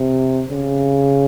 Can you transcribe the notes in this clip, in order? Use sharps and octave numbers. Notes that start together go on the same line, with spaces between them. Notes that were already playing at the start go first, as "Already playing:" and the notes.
Already playing: C3
C#3